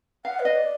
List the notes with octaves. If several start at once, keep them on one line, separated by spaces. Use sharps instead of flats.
F5 F#5
B4
D#5
D5